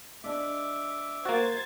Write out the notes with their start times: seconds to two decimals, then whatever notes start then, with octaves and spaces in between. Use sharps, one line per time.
0.24 G#3 D4 E5 D6
1.25 A#3 F#4 C5 G#6 A6